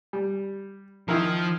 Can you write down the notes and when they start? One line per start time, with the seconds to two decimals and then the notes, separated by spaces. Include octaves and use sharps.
0.13 G3
1.09 D#3 F3 E4 A#4